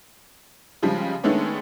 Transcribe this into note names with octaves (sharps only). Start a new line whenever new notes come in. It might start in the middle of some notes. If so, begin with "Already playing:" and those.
C#3 F3 G3 G#3
D#3 G#3 A3 B3 C#4 D4